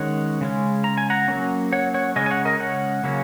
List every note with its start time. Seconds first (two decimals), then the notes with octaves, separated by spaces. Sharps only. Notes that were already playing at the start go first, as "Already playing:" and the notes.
Already playing: D#3 G#3 C#4 C#5 F#5
0.41 C#3 G#3 C#4
0.84 A#5
0.98 G#5
1.10 F#5 A#5
1.28 F#3 A#3 C#4
1.73 C#5 F#5
1.94 C#5 F#5
2.16 C#3 G#3 C#4 D#5 G#5
2.26 G#5
2.31 C#5 F#5
2.45 A#4 D#5
2.60 C#5 F#5
3.04 C#3 F#3 A#3 C#4